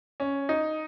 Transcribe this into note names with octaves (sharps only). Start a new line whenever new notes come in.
C#4
D#4